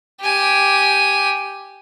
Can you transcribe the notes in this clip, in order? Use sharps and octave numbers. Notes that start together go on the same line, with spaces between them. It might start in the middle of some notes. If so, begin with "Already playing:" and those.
G4 G#5